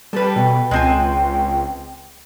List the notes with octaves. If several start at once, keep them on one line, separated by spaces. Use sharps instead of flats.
G3 A4 B4
B2 G5
C#2 G#3 C4 G#5